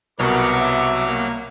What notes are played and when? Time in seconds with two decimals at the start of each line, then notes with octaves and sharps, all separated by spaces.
0.19 C2 B2 A#4 B4 C#5 F#5 C#6 D6
0.60 E5
1.07 A#3